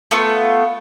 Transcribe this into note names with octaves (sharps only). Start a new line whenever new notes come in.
A3 B3 F4